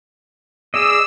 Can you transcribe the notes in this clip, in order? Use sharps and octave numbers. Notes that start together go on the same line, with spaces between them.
G#4 D5 D#5 E6